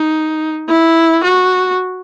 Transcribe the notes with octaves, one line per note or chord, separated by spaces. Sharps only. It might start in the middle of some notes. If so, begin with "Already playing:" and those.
Already playing: D#4
E4
F#4